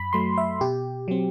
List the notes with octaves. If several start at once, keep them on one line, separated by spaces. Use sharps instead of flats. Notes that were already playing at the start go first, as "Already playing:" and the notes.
Already playing: F#2 B5
F#3 A3 C6
E5
B2 G4
F#3 C4